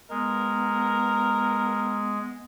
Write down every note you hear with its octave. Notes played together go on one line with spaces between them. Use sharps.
G#3 B3 A#4